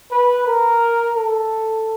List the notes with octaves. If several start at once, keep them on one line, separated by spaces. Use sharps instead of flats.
B4
A#4
A4